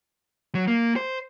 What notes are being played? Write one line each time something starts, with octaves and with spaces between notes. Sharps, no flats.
F#3
A#3
C5